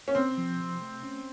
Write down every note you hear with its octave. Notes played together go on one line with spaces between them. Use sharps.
C#4
C3 C4
F3
C3
A3
C#4